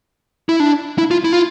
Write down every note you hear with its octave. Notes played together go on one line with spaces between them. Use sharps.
E4
D4
E4
F4
E4
F4